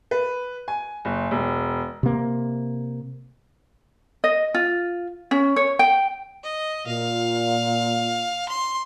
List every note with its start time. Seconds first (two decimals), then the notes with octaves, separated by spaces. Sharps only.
0.11 B4
0.68 G#5
1.05 F#1
1.31 E1
2.03 C3 A#3
4.24 D#5
4.54 F4
5.31 C#4
5.56 C#5
5.79 G5
6.44 D#5
6.87 A#2 F5
8.49 C6